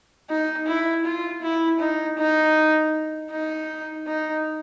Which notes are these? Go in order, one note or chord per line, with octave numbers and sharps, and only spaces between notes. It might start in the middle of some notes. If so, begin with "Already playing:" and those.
D#4
E4
F4
E4
D#4
D#4
D#4
D#4